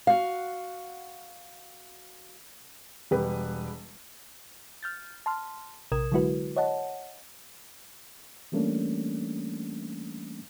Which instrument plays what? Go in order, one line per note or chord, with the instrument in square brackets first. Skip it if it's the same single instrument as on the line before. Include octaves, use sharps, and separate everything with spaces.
[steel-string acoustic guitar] F#4 F5
[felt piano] E1 G3 B4
[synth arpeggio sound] F6 G6 A6
A5 C6 F6
A#1 C3 A#4 D#6 G#6 E7
D3 F#3 G#3 E4 F#4 B4
C#5 D#5 F#5 A5
[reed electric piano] E3 G3 A3 A#3 C#4 D4